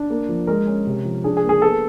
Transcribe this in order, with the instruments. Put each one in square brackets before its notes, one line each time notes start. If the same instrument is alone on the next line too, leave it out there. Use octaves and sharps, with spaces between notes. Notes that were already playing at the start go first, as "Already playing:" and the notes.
Already playing: [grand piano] D4
A#3
F3
G#3 A#4
C#4
C3
F3
D4 G#4
G#4
A#3
G#4
B3 A4